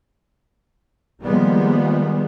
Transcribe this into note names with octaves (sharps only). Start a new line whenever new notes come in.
D#3 F3 G3 G#3 A#3 B3